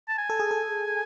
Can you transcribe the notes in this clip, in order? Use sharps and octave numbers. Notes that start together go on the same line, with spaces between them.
A5
G#5
A4
G#4
A4